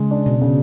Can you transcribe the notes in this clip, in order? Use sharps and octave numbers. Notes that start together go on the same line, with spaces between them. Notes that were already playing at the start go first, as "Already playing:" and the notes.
Already playing: C#3 G#3
D4
B2
C#3